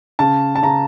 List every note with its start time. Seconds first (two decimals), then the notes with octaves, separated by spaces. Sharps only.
0.19 C#3 A5
0.56 A5
0.63 C#3 A#5